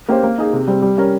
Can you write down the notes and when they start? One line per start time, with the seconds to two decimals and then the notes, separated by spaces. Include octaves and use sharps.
0.09 A#3 C#4 G4 C5
0.23 A#3
0.38 D#4 G#4
0.53 C3
0.68 G3 C4
0.82 G3
0.97 C#4 G4 A#4